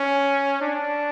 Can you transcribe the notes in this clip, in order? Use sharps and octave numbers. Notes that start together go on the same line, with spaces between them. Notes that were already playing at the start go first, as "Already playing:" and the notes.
Already playing: C#4
D4